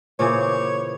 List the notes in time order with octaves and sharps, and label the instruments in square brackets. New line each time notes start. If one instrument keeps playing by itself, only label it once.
[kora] A#2 C#3 E3 [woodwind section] C5 D6 [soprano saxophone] C#5